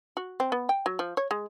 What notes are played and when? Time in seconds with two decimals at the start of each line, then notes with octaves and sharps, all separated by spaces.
0.17 F#4
0.40 C4
0.52 B3
0.69 G5
0.86 F#3
0.99 F3
1.17 C#5
1.31 G#3